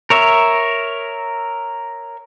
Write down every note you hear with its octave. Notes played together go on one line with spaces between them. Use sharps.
A#4 C#5 E5